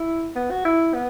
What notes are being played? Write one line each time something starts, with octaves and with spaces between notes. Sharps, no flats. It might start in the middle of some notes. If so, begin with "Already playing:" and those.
Already playing: E4
B3
F#4
E4
B3